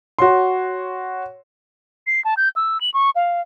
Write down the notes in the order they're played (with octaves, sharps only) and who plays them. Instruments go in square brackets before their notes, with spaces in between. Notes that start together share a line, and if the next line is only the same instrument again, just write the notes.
[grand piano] F#4 C#5 C6
[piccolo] C7
A5
G6
E6
F#7
C#6
F5